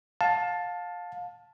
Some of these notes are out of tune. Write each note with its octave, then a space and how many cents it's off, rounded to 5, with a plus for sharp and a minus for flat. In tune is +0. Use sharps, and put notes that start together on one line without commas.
F5 +25 A5 +0